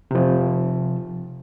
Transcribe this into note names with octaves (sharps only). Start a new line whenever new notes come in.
C3 F3